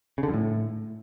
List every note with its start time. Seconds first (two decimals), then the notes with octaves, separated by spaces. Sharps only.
0.18 C#3
0.23 D3
0.28 F#2
0.34 A2